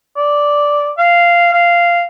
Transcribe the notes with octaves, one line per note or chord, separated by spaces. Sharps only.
D5
F5
F5